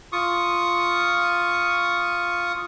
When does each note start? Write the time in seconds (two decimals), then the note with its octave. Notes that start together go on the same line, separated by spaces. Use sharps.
0.12 F4 C#6 D#6